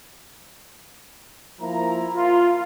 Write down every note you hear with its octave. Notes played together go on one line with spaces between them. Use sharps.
F3 A#3 E4 A#5
F4